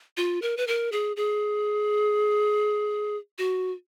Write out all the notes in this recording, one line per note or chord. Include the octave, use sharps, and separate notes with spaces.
F4
A#4
B4
A#4
G#4
G#4
F#4